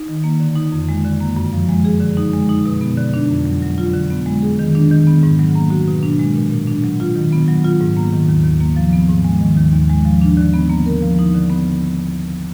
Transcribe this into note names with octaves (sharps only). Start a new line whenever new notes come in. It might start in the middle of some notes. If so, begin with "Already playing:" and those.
Already playing: D#4
D#3
A#3
D3
D#4
F2
G#3
D3
A#3
F#2
F3
G#3
G#4
D3
D#4
G#3
D#4
B2
B3
D3
D4
F2
F#3
F#3
F4
D3
B3
G#3
G#4
D#3
D4
D#3
B3
G#2
F#3
A#3
F#4
B2
D4
G#3
A#2
A#2
D4
F#3
F4
D#3
B3
F#3
F4
G#2
A#3
D#3
D#2
D#2
A#3
F3
B3
G#2
G#3
D#3
D#2
D#2
G#3
F3
D4
D3
B3
A#3
A#4
F3
D#4
D3
B3